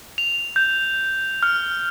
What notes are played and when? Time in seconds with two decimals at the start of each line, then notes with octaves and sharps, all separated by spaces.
0.18 F7
0.56 G6
1.43 F6